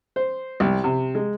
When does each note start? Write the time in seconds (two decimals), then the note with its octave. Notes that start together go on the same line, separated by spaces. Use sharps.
0.16 C5
0.60 C2
0.84 C3
1.15 G#3